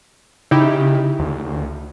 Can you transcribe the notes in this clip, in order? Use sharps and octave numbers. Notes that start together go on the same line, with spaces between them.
C#3 D#4 E4 G4
D2